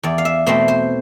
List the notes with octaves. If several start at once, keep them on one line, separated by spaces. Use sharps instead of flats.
E2 D5
F5
E5
B2 A3 C4 C5
C5